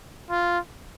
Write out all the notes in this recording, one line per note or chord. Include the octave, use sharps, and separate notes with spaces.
F4